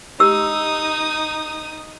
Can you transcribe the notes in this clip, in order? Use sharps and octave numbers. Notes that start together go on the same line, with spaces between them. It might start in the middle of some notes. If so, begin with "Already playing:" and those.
D#4 G4 D#6 E6